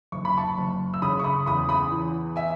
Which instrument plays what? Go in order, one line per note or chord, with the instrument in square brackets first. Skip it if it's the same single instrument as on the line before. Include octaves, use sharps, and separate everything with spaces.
[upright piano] F#1 C#6
B5
A5 C#6
F#1
E6
C#3 B5 D#6
C#6
B5 D#6
E2 B5 D#6
B5 D#6
E3
E5 G#5